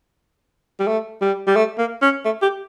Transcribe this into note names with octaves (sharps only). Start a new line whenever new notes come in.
G3
A3
G3
G3
A3
A#3
C#4
A3
G4